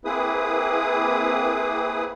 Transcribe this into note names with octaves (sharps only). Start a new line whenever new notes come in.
A#3 C4 E4 G#4 B4 D#6